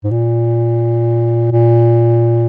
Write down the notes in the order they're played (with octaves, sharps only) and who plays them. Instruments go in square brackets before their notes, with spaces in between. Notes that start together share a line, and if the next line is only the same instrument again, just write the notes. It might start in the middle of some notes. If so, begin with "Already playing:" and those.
[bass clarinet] G#2
A#2
A#2